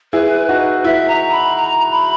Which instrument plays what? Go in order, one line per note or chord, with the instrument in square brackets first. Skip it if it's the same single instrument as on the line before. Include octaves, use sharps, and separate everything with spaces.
[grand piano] E4 G#4 [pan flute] B4
[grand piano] D#4 F#4 [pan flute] B4
[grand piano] E4 [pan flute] E5
[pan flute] A#5
B5
A#5
B5